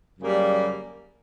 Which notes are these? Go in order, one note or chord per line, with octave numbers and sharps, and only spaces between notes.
F#2 C#3 G3 A#3